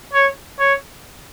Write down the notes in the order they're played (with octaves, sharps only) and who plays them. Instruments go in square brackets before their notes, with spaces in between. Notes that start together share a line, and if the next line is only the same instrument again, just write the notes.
[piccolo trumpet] C#5
C#5